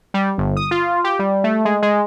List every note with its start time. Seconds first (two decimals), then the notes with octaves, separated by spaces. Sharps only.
0.14 G3
0.38 G1
0.57 D#6
0.71 F4
1.04 G4
1.19 G3
1.44 A3
1.65 G#3
1.82 G#3